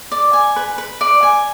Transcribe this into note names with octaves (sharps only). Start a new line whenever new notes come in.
D5
G#5
B4
B4
D5
G#5